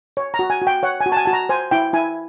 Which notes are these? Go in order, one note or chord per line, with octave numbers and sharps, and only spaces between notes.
C#5
A#5
F#4
G#5
F#4
G5
C#5 F#5
G#5
F#4
A5
G#5
F#4 A5
A#5
C5 G#5
E4 G5
E4 G#5